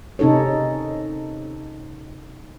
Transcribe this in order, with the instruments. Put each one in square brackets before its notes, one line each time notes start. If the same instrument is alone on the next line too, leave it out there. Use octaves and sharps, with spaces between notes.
[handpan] C3 C#4 D#4 A4 C#5